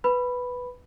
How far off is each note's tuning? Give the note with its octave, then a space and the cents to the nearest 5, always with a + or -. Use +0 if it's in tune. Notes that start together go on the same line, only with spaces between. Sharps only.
B4 +0 B5 +0